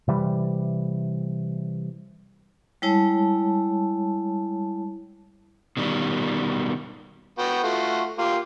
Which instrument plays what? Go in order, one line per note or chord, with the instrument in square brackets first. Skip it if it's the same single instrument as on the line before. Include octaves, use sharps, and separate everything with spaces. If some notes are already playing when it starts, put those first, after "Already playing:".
[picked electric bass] C3 E3 G3
[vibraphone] G3 G#3 E4 C#5 A5
[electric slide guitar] B2 D#3 G3
[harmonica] B3 F#4 G5
A3 F4 F#4
A#3 F4 G4